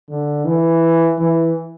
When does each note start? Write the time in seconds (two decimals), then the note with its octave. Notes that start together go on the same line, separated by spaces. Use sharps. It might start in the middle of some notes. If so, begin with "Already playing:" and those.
0.09 D3
0.45 E3
1.18 E3